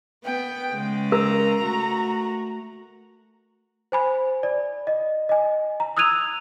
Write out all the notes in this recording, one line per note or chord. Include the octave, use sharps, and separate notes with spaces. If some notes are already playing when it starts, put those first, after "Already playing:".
B3 G5
C#3 G#3
A#4 A#5
A3 F#4
C5 G#5 B5
D5
D#5
D#5 G#5
A#5
D#6 E6 F#6 G#6 D#7 F7